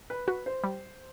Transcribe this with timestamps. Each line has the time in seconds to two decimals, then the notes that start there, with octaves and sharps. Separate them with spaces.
0.10 B4
0.27 F#4 B4
0.46 C5
0.64 G3